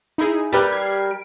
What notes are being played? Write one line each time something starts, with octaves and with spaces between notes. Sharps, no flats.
D#4 E4 G#4
G3 G4 A#4 B4
G#6 C7
D7